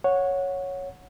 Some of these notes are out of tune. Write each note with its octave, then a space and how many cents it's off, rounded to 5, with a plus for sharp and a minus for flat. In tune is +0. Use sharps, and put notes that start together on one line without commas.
C#5 +0 F#5 -15